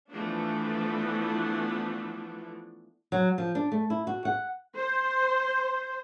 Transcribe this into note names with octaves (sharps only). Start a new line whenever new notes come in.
E3 F3 A3 B3 D4
F#3
F3
D4
A3
E4
F#4
F#5
C5